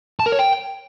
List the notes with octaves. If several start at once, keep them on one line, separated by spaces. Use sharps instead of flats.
A5
A#4
C#5
G5